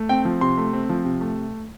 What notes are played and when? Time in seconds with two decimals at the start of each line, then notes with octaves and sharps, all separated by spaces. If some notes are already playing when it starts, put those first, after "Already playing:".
Already playing: A3
0.09 C4 G5
0.25 F3
0.41 C3 C6
0.57 A3
0.73 C4
0.89 F3
1.05 C3
1.21 A3